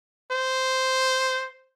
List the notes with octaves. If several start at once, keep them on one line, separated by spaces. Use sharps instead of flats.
C5